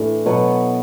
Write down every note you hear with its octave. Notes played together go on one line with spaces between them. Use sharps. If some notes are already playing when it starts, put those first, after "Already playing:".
Already playing: A2 E3 D4
B2 F#3 B3